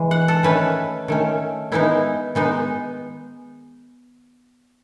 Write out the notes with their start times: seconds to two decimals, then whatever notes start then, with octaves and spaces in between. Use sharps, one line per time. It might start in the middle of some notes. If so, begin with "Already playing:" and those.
Already playing: E3 G#3
0.11 F#5
0.28 A4
0.43 D#3 A3 C#4 B4
1.08 D#3 A3 C#4
1.72 D#3 G#3 B3 D#4 E4
2.35 D#3 G#3 B3 D#4